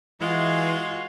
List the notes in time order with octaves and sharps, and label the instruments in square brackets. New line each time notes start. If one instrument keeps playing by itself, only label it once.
[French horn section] E3 [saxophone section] G#3 [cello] F4 [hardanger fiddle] F#4